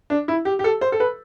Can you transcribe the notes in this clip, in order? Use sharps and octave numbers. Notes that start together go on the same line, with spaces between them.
D4
E4
G4
G4
A4
C5
A4
B4